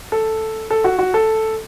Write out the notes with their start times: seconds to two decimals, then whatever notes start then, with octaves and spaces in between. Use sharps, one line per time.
0.12 A4
0.70 A4
0.84 F#4
0.99 F#4
1.14 A4